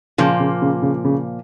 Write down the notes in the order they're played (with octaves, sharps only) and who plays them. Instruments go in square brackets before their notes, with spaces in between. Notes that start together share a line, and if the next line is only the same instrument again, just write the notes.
[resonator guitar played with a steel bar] A#2 F3 A#3 [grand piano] C#3
[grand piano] C#3
C#3
C#3
C#3